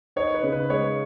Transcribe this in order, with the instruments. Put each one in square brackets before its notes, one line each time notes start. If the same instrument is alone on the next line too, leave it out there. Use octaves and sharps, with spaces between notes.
[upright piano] D#4 [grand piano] C#5
[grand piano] B4
[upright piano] C#3
[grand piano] B4
[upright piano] G#3 [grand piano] C#5